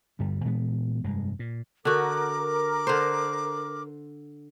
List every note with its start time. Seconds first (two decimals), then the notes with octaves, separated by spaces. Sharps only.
0.19 D2 G2 D3 G3
0.45 A#2 E3 G#3 B3
1.04 F1 G2 G#3
1.39 A#2
1.85 D3 F#4 A#4 D6
2.87 D3 C5